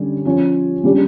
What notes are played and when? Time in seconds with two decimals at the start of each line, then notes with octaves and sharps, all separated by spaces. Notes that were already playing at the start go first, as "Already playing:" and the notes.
Already playing: D3 G3 C#4
0.25 F3 C#4 F4
0.84 C#3 G3 D4